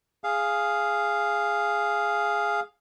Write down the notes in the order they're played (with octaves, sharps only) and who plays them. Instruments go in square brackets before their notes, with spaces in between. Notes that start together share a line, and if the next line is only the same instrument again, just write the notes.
[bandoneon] G#4 F5